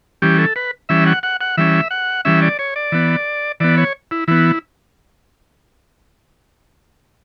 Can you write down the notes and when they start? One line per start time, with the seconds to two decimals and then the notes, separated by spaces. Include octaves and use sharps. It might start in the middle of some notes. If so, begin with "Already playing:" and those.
0.22 E3 G3 C#4 G4
0.38 A4
0.56 B4
0.89 E3 G3 C#4 E5
1.07 F#5
1.23 F#5
1.41 F#5
1.57 E3 G3 C#4 E5
1.91 F#5
2.25 E3 G3 C#4 E5
2.42 D5
2.59 C#5
2.76 D5
2.92 E3 B3
3.60 E3 B3 D5
3.78 C#5
4.11 E4
4.28 E3 B3 E4